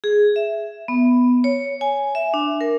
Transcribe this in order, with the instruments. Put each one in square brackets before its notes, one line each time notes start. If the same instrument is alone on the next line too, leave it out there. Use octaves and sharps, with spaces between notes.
[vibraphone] G#4
E5
B3
C#5
G#5
E5
D4
A#4